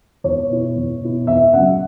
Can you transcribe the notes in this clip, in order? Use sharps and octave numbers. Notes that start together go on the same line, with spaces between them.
E2 C#5
B2 B3 E4
E2
B2 B3 E4
E2 E5
C#3 F#3 F#5